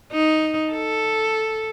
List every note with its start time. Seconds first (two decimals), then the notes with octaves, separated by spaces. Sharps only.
0.12 D#4
0.72 A4